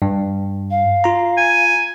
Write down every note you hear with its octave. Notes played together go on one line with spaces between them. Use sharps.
G2
F5
F4 A#5
G#5